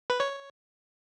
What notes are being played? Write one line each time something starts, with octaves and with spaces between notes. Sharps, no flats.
B4
C#5